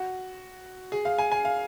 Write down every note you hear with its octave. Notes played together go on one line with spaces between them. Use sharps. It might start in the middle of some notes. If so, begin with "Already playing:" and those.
Already playing: F#4
G#4
F5
G#5
G#5
F5